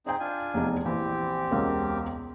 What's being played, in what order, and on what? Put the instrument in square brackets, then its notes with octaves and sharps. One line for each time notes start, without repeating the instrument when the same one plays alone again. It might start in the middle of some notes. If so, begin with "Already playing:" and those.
[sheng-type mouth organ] C4 D#4 G#4 [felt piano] D#5 G5
[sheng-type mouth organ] D4 F4 G#5
[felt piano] F1 E2 D#4
[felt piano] A#1 E3 [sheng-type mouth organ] C4 G4
[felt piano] E1 C#2 A#4